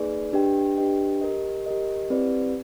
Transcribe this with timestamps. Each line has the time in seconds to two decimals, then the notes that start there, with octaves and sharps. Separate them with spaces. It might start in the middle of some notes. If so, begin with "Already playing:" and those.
Already playing: A#3 D#4 G#4 B4 D5
0.33 D4 G4 B4 D#5 G5
0.78 D4 G4 B4 D#5 G5
1.21 G4 A#4 D#5
1.66 G4 A#4 D#5
2.10 C4 E4 G4 B4 D5